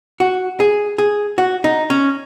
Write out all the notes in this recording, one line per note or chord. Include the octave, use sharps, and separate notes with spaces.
F#4
G#4
G#4
F#4
D#4
C#4